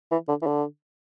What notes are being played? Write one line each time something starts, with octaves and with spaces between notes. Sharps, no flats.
E3
D3
E3
D3